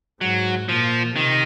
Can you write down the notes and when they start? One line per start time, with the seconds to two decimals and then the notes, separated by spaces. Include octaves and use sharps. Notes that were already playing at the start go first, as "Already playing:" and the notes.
0.21 G#2 F#3
0.68 A#2 F3
1.15 C3 D#3